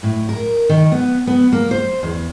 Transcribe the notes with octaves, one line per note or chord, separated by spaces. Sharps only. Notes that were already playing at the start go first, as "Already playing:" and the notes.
A2
A#4
D#3
B3
B3
A#3
C5
E2